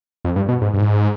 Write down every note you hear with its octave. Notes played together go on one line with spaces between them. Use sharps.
F2
G2
B2
G#2
G2
G#2